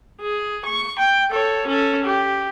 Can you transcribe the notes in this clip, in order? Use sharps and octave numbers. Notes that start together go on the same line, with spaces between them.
G#4
C#6
G5
A4 C#5
C#4 A4
G4